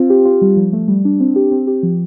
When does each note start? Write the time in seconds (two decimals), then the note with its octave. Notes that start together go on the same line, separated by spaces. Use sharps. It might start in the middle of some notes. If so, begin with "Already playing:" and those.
Already playing: C4 F4
0.10 G4
0.25 F4
0.42 G3
0.57 F3
0.73 A3
0.88 G3
1.05 D4
1.20 C4
1.36 G4
1.51 C4
1.67 G4
1.83 F3